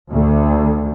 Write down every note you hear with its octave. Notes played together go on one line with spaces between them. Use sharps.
D2